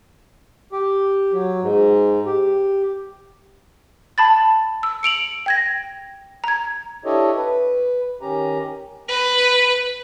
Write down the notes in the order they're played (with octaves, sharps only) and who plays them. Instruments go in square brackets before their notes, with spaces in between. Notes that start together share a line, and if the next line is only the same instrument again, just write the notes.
[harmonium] G4
F#3
G#2
G4
[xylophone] A5 B5 A6
E6
C#7 D7 F7 F#7
G5 G#6 A#6
A#5 G#6
[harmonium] D4 E4 G4 A4 C#5 D#5
B4
D#3 C#4 G4 A#5
[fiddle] B4